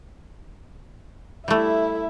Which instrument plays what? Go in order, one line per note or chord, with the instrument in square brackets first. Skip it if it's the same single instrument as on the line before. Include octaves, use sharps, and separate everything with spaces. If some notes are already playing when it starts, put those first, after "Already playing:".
[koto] G3 A3 [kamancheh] E4 E5